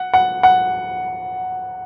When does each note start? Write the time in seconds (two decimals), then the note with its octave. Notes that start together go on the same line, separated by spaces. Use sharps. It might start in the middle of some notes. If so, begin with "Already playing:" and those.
Already playing: F#5
0.14 F#5
0.43 F#5